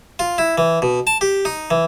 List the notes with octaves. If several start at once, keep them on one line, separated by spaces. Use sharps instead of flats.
F4
E4
E3
B2
A5
G4
D#4
E3